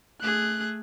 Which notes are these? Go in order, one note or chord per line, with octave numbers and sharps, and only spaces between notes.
A3 G#4 F#6